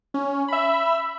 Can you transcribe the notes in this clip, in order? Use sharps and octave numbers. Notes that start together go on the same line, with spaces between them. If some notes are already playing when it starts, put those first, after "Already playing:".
C#4
E5 B5